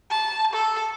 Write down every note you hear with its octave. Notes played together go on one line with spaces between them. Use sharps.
A5
A4